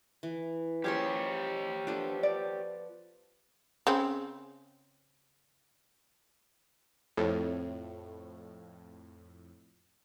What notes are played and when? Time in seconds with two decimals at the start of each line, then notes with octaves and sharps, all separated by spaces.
0.23 E3
0.84 F3 G3 C#4 G4 G#4 C#5 C6
1.87 F3 B3 D4 A4
2.23 D5
3.87 C#3 C4
7.17 F2 A2